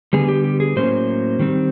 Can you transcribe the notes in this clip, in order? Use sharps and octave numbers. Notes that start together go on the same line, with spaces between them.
D3 G3 B3 G#4
G4
G4
G#4
A2 F#3 A#3 C#4 C5
D#3 G3 C4